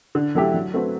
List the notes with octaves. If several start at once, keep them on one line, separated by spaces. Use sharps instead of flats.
D3
F#3 A3 E4 G4
F#3
A3 C4 F#4 B4